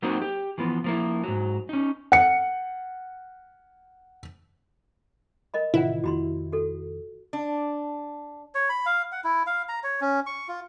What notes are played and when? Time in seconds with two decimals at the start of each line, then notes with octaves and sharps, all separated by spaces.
0.02 F#3 A#3 C4 D#4 F#4
0.22 G4
0.58 E3 F3 B3
0.84 F3 A#3 E4
1.24 G#2 F#3
1.69 C#4 D#4
2.12 F#5 C#7
5.54 A#4 D#5 B5
5.74 A1 C3 D#3 E4 F4 C5 F#5
6.04 F1 F2 D#3 F#4 B5 C6
6.52 F#4 A4
7.33 D4
8.55 C#5
8.69 B5
8.86 F5
9.12 F#5
9.24 E4
9.47 F5
9.69 A#5
9.83 C#5
10.01 C#4
10.26 C#6
10.48 F4